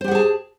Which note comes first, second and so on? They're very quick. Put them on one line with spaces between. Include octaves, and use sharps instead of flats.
C5 G4 F#5 G#4 A5